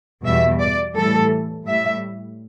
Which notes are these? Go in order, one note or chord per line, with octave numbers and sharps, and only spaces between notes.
E2 B2 G3 E5
D5
A2 E3 G3 A4
A2 G3 E5